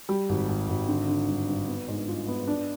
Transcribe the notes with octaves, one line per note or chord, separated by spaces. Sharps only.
G3
G#1
G#1
G#1
D3
D3
G2
G2
B3
G#2
F4
B3
D4